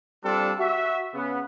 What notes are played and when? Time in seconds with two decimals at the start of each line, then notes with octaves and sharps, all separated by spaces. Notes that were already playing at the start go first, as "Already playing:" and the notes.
0.24 G3 C4 D4 F4 A4
0.59 F#4 E5
1.14 C#3 B3